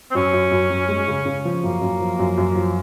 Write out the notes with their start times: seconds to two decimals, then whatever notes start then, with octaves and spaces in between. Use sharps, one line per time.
0.11 C4
0.15 F#2 C#4
0.33 F#2
0.52 F#2
0.70 F#2
0.89 G#3
1.08 C#3
1.26 C#3
1.45 F3
1.64 F#2 A#3
1.82 F#2
2.01 F3
2.19 F#2
2.38 F#2
2.56 F3